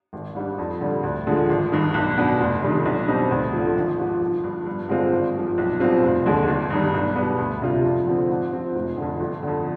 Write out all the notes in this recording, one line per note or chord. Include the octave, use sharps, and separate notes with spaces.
G#1
G#2 G3 D4
F2
D3 G3
D2
D3 F3 G#3
G#1
G2 D#3
B1
B2 B3 D4
F1
F2 D#3 G3 D4
B1
B2 G3 C4 D#4
D2
D3 F3
G#1
G#2 F3
G1
G2 F3
G2
D3 G#3 C4 F4
G#1
G2 F3
B1
B2 G3 C4 F4
F1
D#2 D3 G#3
G1
G2 D#3 G3
B1
B2 G3 B3
D2
C3 G3 D4 F4
F2
D3 F3 C4
G#2
F3 C4
F1
F2 D3
G1
F2 D3